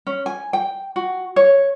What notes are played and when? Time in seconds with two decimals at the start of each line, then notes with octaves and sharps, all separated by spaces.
0.07 C#4
0.26 G#5
0.53 G5
0.96 F#4
1.36 C#5